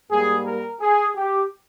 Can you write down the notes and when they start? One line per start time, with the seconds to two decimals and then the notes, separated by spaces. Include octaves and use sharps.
0.11 G#2 G3 A#3 G#4
0.46 A#4
0.81 G#4
1.16 G4